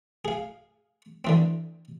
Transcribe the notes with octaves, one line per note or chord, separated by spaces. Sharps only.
G#4 F5
D3 E3 C4